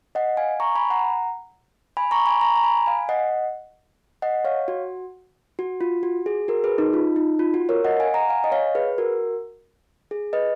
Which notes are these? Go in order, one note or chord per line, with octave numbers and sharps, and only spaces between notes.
D#5 F#5
F5 G#5
A#5 C#6
G#5 B5
F#5 A#5
G#5 B5
A#5 C#6
G#5 B5
A#5 C#6
A#5
G#5 B5
F5 G#5
D#5 F#5
D#5 F#5
C#5 F5
F#4
F#4
F4
F#4
G#4
F#4 A#4
G#4 B4
D#4
F4
D#4
F4
F#4
A#4 C#5
D#5 F#5
F5 G#5
F#5 A#5
F5 G#5
D#5
C#5 F5
G#4 B4
F#4 A#4
G#4
B4 D#5